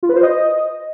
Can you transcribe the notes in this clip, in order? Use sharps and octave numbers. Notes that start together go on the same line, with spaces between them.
F4
B4
C5
D#5